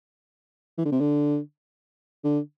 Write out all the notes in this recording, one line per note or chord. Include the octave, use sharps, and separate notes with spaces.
E3
D3
C3
D3
D3